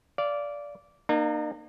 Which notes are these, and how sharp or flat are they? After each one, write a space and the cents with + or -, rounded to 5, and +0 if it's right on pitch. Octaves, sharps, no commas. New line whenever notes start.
D5 -15 F5 -15
A#3 +0 D#4 -45